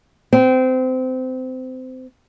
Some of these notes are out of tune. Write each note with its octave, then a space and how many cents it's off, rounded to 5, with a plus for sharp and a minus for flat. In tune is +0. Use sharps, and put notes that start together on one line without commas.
C4 -25